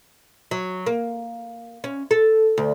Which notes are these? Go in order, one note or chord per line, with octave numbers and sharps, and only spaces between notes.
F#3
A#3
C#4
A4
D2